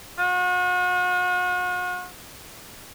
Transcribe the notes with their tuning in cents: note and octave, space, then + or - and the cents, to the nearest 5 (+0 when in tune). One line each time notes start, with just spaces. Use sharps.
F#4 -40